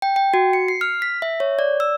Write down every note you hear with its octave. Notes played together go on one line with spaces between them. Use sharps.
G5
G5
F#4
C#7
C7
F6
B6
E5
C#5
D5
E6